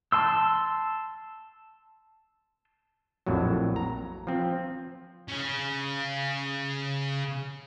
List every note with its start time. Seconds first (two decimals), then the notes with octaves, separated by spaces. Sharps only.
0.12 A5 C6 E6
3.26 A#1 F2 A2 F#3
3.76 A#5
4.27 F3 C4
5.28 C#3 C#4